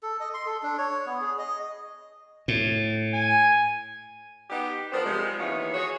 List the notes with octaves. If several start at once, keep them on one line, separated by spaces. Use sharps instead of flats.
A4
D#5
C6
A4
D4
C#5
B3
G#4
D#5
A2
G#5
B3 D#4 G4
F3 B3 D4 A#4 C5
C3 F3 G3 G#3
D#2 E3 B3 C#5 F5
F#4 G#4 C#5